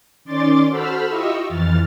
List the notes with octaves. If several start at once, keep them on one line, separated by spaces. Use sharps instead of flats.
D#3 C#4 D5 C6 D6 A6
F#4 A4 C5 B5 E6 F6
E4 F4 G4 D#5 C#6 E6
F2 E3 F6 A6